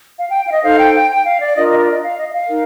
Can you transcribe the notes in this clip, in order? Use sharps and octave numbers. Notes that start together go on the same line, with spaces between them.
F5
G5
F5
D#5
D#4 A4 C5 F5
G5
G5
G5
F5
D5
D4 F4 A#4 D#5
D#5
D5
D#5
F5
D#5
D#5
F5
D#4 A#4